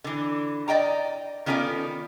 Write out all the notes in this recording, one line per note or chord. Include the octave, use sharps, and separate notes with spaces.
D3 E3
D5 D#5 G5 A#5
D#3 B3 C#4 F4 A4 D5